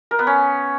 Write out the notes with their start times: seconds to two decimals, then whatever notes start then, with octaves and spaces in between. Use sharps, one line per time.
0.11 A#4
0.19 B3
0.27 C#4